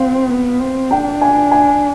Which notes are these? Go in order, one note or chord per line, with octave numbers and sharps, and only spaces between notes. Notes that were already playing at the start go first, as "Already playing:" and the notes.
Already playing: C4 F5
B3
C4
D4 G5
G#5
G#5